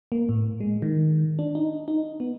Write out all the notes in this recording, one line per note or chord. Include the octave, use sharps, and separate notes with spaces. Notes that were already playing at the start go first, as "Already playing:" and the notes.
A#3
A2
G#3
D#3
D4
D#4
D#4
B3